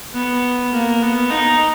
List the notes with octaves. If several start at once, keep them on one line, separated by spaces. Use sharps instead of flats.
B3
A#3
B3
D#4